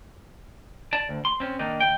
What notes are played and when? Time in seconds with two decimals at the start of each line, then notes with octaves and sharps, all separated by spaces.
0.93 D5 A5
1.09 D2
1.25 C6
1.40 C4 C#4
1.59 D#3 A#3 D4 D#4
1.80 D#2 G5